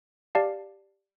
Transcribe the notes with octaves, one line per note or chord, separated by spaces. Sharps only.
G4 D5 F5 A5